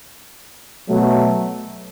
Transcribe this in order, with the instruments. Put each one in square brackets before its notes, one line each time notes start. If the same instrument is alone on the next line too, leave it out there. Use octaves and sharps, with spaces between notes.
[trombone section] B2 F#3 A3